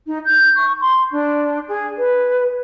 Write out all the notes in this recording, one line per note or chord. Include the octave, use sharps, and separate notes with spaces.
D#4
G6
C#6
C6
D4
G#4
B4